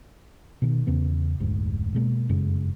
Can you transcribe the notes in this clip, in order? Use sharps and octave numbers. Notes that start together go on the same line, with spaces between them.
B2 D#3
E2 C#3 B3
F1 D2 G#2
B2 G#3 A#3
F1 F#2 C#3 G#3